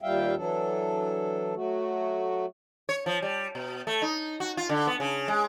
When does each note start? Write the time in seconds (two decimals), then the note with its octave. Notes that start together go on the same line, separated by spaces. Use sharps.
0.02 D#2 A#2 G3 E5 F5 G5
0.36 E3 F#3 D4 A4
1.55 F#3 A3 F#4
2.89 C#5
3.06 F3
3.22 G3
3.55 B2
3.87 A3
4.02 D#4
4.40 F#4
4.57 F4
4.69 D3
4.87 B3
5.00 C#3
5.28 G#3